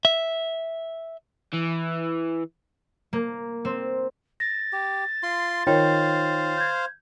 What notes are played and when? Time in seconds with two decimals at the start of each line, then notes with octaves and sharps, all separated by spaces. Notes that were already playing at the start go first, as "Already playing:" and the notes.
0.05 E5
1.53 E3
3.13 A#3
3.65 C4
4.40 A6 A#6
4.73 G4
5.23 F4 C6
5.67 D#3 F4 C5 C#5 F5 G5
6.58 G6 G#6